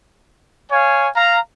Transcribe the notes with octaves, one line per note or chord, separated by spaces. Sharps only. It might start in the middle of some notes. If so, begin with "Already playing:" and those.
C#5 F5 G#5
F5 A#5